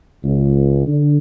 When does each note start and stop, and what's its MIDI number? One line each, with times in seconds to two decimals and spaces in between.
0.24 0.86 37
0.86 1.17 50